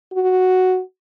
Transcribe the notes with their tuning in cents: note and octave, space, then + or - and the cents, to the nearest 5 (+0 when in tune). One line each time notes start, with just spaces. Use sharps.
F#4 +0